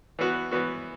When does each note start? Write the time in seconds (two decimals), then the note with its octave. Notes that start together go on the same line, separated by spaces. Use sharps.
0.19 E3 B3 F#4
0.51 E3 B3 F#4